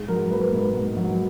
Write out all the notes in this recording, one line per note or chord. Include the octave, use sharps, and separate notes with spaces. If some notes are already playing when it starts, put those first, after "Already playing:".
Already playing: G#2 G#4
F#3 A#4
A#3 B4
G#2
G#2
F#3